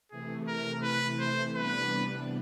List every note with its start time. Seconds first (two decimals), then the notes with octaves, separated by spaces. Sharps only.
0.11 C3 E3 A3 G#4
0.47 A#4
0.83 B4
1.19 C5
1.55 C3 E3 G3 B3 D4 B4